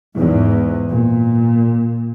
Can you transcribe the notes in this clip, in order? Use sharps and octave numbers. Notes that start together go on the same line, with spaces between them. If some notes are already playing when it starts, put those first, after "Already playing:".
E2 G#2
A#2